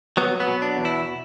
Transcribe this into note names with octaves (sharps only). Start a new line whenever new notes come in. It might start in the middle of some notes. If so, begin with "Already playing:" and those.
F#3 B3
B3
B2
D4
E2
E4